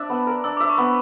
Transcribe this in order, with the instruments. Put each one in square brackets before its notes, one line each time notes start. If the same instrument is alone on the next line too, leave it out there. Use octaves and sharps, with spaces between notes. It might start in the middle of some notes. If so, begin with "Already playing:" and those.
Already playing: [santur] D4 E5
B3
A#4
[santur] D4 [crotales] E6
[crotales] D6
[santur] E5
[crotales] C#6
[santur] B3